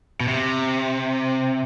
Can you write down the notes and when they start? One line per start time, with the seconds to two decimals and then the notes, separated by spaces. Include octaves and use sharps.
0.21 B2
0.28 C3